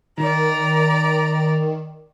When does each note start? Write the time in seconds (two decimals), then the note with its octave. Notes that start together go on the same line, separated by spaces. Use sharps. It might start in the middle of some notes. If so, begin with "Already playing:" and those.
0.17 D#3 D5 A#5